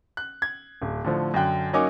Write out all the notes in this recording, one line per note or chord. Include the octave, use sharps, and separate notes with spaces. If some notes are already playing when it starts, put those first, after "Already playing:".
F#6
G#6
D1
A2 D3 F3
F#2 D3 G5 F#6
F#3 A#3 C#4 D#4 G#5 D6